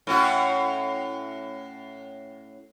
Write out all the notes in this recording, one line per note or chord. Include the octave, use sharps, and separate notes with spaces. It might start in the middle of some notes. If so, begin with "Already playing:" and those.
A2 C#4 F#4